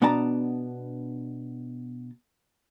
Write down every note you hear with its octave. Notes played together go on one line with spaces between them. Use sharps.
B2 B3 D4 D5 A5 A#5